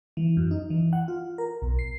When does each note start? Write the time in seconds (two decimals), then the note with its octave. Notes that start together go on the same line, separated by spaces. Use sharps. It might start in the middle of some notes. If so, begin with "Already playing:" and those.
0.17 E3
0.37 F#2
0.51 D#4
0.70 E3
0.93 F#5
1.08 F4
1.38 A#4
1.62 B1
1.79 C7